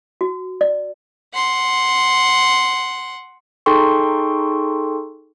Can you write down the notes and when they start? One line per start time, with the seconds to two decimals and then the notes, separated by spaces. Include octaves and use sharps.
0.21 F#4
0.61 D5
1.34 F#5 C6
3.66 D#4 G#4 A4 G5 C6 C#6